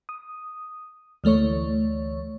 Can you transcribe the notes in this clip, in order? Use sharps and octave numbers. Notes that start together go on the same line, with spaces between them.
D#6
D2 E3 A3 C#5 C#6